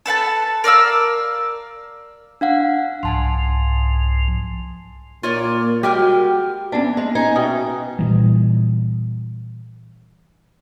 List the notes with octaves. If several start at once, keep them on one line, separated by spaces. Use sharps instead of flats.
A4 B4 F#5 A5
A#4 D5 F5 E6
D4 F5 F#5
C2 G#2 F3 G#5 A5 C6
A#2 A#3 F4 C#5 D5
G3 G#3 F#4 G4 A#4 G5
E3 A#3 B3 C#4 D4
G#3
D#4 G#5
B2 E5 G5 D#6
A#2 E3 G3